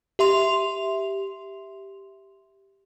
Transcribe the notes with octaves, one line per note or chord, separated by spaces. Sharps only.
G4 E5 C6 F7